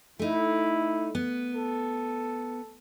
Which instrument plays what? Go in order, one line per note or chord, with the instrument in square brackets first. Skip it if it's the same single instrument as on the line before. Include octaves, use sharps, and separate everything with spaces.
[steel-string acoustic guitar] A3 D#4 [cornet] E4
[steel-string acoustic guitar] B3
[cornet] A4